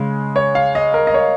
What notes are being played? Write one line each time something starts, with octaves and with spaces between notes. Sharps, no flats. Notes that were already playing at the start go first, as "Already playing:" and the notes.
Already playing: C#3 G#3
C#5
F5
D#5
A#4
D#5
C#5